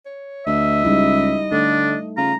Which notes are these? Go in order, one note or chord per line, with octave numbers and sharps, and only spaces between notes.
C#5
D2 D#5 E5
C#2 G3 D#4 E4
D3 A3 D4
C#3 F4 A#5